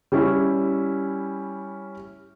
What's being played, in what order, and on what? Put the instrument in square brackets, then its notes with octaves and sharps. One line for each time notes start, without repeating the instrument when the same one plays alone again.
[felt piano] G3 C#4 E4